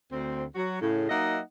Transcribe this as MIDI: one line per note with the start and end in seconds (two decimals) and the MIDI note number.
0.11 0.43 38
0.11 0.43 60
0.55 0.76 54
0.55 0.76 66
0.80 1.06 45
0.80 1.06 49
1.09 1.39 54
1.09 1.39 58
1.09 1.39 63
1.09 1.39 75
1.09 1.39 76
1.09 1.39 78